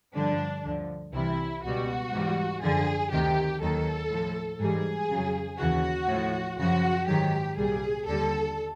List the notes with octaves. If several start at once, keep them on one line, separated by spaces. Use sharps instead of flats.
G2 D3 F3 D4
D2 D3 F3
C2 C3 E3 G3 E4
C#2 B2 G3 F#4
G#2 E3 G3
F#2 D3 F3 G#4
D2 C3 D#3 G4
D#2 D#3 F#3 A4
A2 F3
G#2 E3 G3 G#4
F2 C#3 F#3
D#2 C#3 E3 F#4
A2 F3
F#2 C#3 F3 F#4
G#2 D#3 F#3 G4
C2 A#2 G3 G#4
D#2 D3 G3 A4